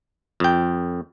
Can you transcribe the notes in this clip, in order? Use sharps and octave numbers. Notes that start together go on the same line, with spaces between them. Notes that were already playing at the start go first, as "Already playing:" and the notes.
F2 G5